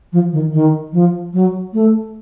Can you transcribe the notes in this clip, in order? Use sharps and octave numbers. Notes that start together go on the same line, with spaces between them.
F3
D#3
D#3
F3
F#3
A3